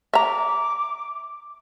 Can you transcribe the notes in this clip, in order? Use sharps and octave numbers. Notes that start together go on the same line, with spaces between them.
E5 A#5 D6